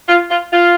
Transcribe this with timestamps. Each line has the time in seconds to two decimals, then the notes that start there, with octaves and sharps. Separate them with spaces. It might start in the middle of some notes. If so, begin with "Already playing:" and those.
0.08 F4
0.30 F4
0.53 F4